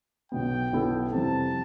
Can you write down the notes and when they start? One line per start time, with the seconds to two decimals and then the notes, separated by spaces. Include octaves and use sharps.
0.32 B1 B2 B3 G5
0.73 B1 B2 B3 E4 A4
1.13 F2 C3 E3 G3 A5